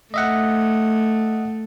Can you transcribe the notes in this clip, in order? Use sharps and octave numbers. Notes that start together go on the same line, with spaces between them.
A3 D#5 E5 F#5